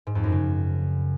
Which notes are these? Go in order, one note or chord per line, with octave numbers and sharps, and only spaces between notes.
G#2
F2
F#2
C#3